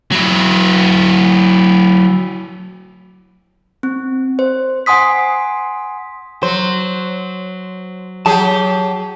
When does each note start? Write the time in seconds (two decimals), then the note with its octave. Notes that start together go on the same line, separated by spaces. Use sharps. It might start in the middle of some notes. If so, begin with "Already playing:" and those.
0.12 F#3 E4
3.83 C4
4.39 C5
4.86 F#5 G#5 C6 D#6 B6
6.43 F#3 C5
8.26 F#3 G4 G#4 A5